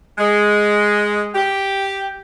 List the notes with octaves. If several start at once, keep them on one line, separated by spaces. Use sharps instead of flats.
G#3
G4